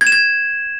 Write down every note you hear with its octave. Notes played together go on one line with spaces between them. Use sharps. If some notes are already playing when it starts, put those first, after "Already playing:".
G#6
E7
G#6